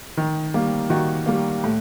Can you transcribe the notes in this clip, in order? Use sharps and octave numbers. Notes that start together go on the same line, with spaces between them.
D#3
G3 A#3
D#3 F#4
G3 A#3
A2